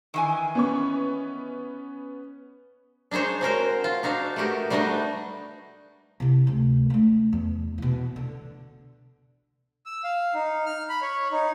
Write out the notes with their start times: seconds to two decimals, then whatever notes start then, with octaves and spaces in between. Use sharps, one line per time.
0.14 D#3 E3 G#5
0.55 B3 C#4 C#6
3.11 D4 D#4 G#4 C5 C#5
3.41 C4 F#4 A#4 C5
3.84 F4
4.03 D4 D#4 F#4 F5
4.36 A3 B3 F#4 G4 A#4
4.70 G3 A3 D4 D#4 F#4 D#5
6.20 C3 E4
6.47 D2 C3
6.90 A3 D4
7.33 E2
7.78 B2 E3
8.16 D3
9.86 E6
10.04 F5
10.34 D#4
10.66 F6
10.89 B5
11.02 C#5
11.32 D#4